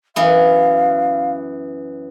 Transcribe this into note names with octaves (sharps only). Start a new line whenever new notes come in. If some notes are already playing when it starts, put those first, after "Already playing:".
F#2 E3 B3 F5